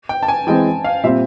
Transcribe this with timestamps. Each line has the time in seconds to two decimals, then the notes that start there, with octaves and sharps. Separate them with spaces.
0.09 G5
0.23 A5
0.28 G#5
0.47 E3 G#3 C4 G5
0.84 F5
1.03 A#2 G3 C4 E5